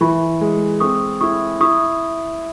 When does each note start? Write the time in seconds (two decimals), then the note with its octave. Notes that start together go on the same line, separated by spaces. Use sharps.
0.01 E3 B5 C#6
0.41 G#3
0.80 C4 C#6 D#6
1.21 E4 C#6 D#6
1.61 E4 C#6 D#6